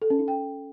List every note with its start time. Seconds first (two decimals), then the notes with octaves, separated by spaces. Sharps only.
0.02 A4
0.10 C#4
0.19 D#4
0.28 G5